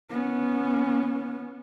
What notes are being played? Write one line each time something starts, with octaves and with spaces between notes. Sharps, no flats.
B3 C#4